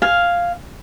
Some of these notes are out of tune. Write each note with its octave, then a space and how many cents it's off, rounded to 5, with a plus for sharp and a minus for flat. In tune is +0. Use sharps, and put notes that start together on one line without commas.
F5 +0 G#5 +0